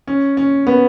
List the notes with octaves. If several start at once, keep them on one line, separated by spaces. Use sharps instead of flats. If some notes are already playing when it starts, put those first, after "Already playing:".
C#4
C#4
B3